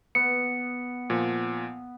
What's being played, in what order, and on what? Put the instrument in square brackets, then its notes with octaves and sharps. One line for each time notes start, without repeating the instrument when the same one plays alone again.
[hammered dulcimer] B3 [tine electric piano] C#7
[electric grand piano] A#2 F3